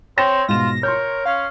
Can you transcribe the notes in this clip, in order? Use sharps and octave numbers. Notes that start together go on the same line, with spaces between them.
C4 C#5 G5 A#6 E7
G#2 B2 F4 A#6 E7
A#4 C#5 C6 G6
C#4 F5